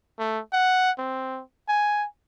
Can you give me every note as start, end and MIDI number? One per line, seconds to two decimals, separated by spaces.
0.19 0.40 57
0.53 0.91 78
0.98 1.41 60
1.68 2.06 80